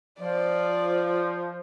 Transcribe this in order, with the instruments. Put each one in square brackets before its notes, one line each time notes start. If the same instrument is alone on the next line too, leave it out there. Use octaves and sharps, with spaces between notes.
[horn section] F3 [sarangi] D5